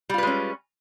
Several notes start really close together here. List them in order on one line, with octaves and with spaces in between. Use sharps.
G3 F4 B4 G#3 C#4